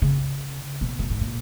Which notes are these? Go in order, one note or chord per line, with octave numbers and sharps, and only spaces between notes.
C#3
B2
F#2
G#2
A#2